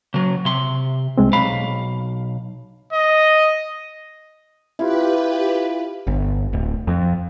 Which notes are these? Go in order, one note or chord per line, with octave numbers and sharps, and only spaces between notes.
C#3 F#3
C3 C6
C2 G#3 C4
B1 F5 B5
D#5
E4 F4 G4 B4
G1
D1
F2